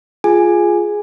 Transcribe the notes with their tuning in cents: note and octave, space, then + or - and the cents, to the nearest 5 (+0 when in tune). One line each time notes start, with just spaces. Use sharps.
F4 +0 G#4 +0 G#5 +0